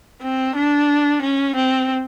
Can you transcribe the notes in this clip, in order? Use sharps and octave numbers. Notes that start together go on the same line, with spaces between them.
C4
D4
C#4
C4